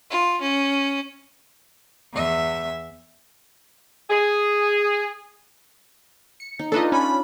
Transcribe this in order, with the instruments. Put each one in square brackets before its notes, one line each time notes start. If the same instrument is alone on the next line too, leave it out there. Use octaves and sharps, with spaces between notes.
[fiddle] F4
C#4
[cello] E2 E5
[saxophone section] G#4
[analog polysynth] C#7
[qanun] D#4
[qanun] D4 D#4 F4 [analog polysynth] A4 B4 D#5
[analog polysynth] C#4 [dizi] B5